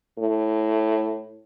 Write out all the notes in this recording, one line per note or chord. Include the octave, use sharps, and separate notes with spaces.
A2